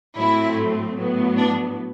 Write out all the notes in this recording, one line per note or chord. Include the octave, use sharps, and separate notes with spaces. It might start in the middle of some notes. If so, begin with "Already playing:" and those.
A2 F#3 A3 C4 E4
A2 F#3 B3
D4